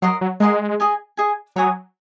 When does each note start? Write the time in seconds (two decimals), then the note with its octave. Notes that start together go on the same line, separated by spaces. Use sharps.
0.02 F#3 A#4 D#5 F#5 C6
0.21 F#3
0.40 G#3 A#4 D#5 F#5 C6
0.80 G#4 D#5 G#5
1.17 G#4 D#5 G#5
1.56 F#3 C#5 G#5 D#6